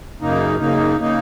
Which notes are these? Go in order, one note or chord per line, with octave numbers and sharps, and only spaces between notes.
F#2 C#3 A#3 D#4
F#2 C#3 A#3 D#4
C#3 A#3 D#4